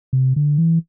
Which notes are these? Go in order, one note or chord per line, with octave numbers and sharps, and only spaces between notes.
C3
D3
E3